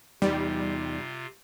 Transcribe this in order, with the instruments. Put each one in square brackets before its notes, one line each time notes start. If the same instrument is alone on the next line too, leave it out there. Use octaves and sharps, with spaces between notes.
[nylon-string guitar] E2 D#4 D5 [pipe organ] C3 F4 [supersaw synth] G3